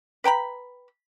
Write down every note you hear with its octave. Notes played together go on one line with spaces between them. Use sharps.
B4 G5 A#5 B5